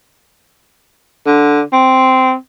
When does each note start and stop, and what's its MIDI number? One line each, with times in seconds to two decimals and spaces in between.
1.26 1.62 50
1.73 2.34 60